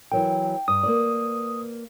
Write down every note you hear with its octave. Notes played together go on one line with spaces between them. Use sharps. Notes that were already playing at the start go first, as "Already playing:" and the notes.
E3 F#3 A#4 G5
G2 D#6
A#3 B4 D5